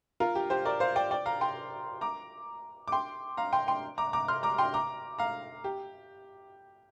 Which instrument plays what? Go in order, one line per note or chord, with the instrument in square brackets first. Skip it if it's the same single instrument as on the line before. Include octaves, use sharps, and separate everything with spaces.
[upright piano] F4 A#4
G4
G4 C5
A#4 D5
C5 F5
D5 G5
D5 G5
F5 A#5
G5 C6
A#5 D6
D6
G5 C6
F5 A#5
G5 C6
G5 C6
A#5 D6
A#5 D6
C6 F6
A#5 D6
G5 C6
A#5 D6
F5 A#5
G4